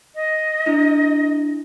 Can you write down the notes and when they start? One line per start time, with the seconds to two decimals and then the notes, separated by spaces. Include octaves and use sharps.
0.15 D#5
0.66 D4 E4